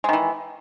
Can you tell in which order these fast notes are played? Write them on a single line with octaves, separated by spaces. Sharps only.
G#3 D#3 E3